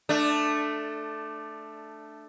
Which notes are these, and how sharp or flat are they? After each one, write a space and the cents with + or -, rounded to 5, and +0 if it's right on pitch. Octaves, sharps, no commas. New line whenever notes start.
A3 +0 D4 +15